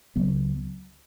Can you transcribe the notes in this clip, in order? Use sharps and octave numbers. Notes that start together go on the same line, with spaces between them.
C#2 C#3 F#3 B3